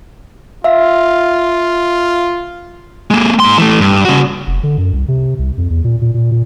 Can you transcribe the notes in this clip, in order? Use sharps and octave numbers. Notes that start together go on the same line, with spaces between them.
F4 E5 F5
G#3 A#3
G#2 C6
E3 A3
G2
C#3 F#4
F1
D3
F#2
C2
C3
C2
F2
E2
A#2
A#2
A#2
A#2